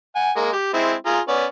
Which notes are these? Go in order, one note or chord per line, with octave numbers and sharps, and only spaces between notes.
F#5 G#5
G#3 A#3
G4
G#3 C4 E4
F4 G#4 A#5
B3 C#4 D5